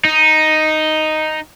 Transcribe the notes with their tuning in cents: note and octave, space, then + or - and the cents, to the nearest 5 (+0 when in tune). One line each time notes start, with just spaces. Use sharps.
D#4 +0